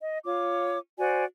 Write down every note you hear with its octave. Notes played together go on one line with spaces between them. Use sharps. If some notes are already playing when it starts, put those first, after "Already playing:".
D#5
F4 C#5 D6
F#4 C5 D5 G#5